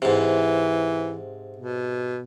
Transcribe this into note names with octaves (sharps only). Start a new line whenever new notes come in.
G#2 C3 E3
B2